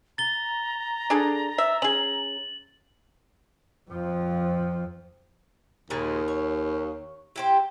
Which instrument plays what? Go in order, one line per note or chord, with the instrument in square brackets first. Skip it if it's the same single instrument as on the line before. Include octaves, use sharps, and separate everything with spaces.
[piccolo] A#5 [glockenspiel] A6 G7
[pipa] D4 G#4 A4
E5
[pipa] C#4 G#4 [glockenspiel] F#7
[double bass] F2 F3
[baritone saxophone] D#2 [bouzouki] A#2 C#3 G#3
[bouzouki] C#5
E4 G4 C5